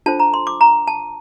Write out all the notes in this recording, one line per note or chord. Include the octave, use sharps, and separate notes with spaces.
D4 F4 A4 C5 A5
A#5
C6
D6
A#5
A5